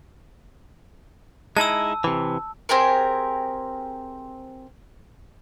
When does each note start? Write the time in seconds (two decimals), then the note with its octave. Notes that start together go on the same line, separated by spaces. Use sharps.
1.57 G#3 D#4 E4 A5 E6
2.04 C3 E3
2.69 C4 G4 G#4 A#4